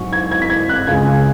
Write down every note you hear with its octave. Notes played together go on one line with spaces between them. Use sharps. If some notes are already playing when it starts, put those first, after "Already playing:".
Already playing: G#2 F#3 C#6
G#6
G#6
B6
G#6
F#6
C#2 C#3 G#3 G#6